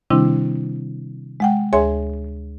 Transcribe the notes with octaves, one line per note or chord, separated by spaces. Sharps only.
C3 D#3 G3 C4 D4 E4
G#3 F#5 G5
D2 G#4 C#5 E5 G#5 C6